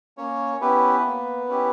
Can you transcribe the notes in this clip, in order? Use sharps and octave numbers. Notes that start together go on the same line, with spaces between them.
A#3 C#4 C#5
B3 C#4 E4 G4 B4
A#3
C#4 E4 G4